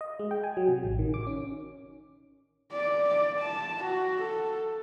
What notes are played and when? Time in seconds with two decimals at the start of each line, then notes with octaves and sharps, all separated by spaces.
0.01 D#5
0.19 G#3
0.31 G5
0.44 G#5
0.57 F#3
0.68 C3
0.84 A1
0.99 D#3
1.14 D6
1.27 C#4
2.72 D5
3.08 D5
3.39 A5
3.82 F#4
4.20 A4